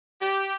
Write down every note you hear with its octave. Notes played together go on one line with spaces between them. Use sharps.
G4